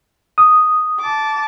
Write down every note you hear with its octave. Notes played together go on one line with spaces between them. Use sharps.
D#6
A5 D6